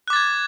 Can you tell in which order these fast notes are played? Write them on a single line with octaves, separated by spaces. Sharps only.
F#6 D6 A6 G#6